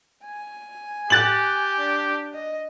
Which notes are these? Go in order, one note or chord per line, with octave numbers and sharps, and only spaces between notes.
G#5
G4 F#6 A6 F#7
D4
D#5